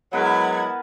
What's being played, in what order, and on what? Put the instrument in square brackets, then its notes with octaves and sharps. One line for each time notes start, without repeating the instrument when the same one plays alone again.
[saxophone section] F#3 G#3 [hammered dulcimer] B3 A#4 B4 [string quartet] E4 F#5 G#6